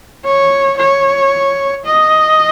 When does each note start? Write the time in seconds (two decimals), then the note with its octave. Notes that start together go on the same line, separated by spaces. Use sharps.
0.25 C#5
0.78 C#5
1.85 D#5